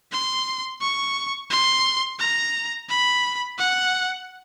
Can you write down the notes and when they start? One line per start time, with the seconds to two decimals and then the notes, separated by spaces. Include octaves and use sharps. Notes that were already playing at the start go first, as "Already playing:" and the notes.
0.12 C6
0.81 C#6
1.50 C6
2.19 A#5
2.89 B5
3.58 F#5